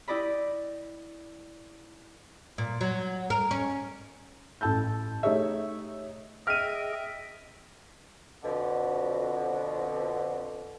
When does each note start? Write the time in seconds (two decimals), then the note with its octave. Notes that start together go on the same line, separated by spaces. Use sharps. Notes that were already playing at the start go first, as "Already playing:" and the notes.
0.08 E4 G4 D5 D#5 B5
2.58 A#2
2.81 F#3
3.30 A#4
3.51 C#4
4.61 A1 A4 A5 E6 G6
5.23 A3 D#4 G4 G#4 C#5 E5
6.47 G#4 D#5 E5 G5 F6 D#7
8.43 F2 B2 D3